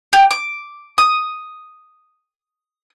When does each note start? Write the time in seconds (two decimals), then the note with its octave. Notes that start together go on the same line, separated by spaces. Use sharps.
0.13 G4
0.31 D6
0.98 D#6